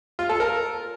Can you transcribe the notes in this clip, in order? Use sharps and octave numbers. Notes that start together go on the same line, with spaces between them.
F4
A4
A#4